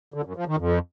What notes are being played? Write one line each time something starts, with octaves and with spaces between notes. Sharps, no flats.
D3
F#2
F3
D#3
F2